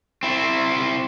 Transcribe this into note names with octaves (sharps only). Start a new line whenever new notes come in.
C4 E4